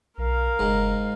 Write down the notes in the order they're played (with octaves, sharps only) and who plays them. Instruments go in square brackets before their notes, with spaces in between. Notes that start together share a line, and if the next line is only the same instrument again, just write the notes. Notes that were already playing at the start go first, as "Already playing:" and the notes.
[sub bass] B1 [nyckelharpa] A#4 F5
[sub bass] F#1 [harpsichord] G#2